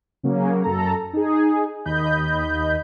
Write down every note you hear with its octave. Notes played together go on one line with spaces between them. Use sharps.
C#3 F#3 A#3 C#4
F#2 A4 A#5
D#4 G#4
D#2 D#5 B5 G6